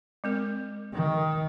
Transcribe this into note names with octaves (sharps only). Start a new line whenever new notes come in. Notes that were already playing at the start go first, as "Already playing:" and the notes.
G#3 C4 A#4
D#3